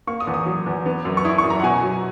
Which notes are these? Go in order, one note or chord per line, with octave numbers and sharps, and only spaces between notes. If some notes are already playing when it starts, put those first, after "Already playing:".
A#3 C#6
D#6
E2
D#6
F#3
E2
B3
F#2
C#6
E4 D#6
C#6
F#2
A#5
F#5
B2 G#5
F#3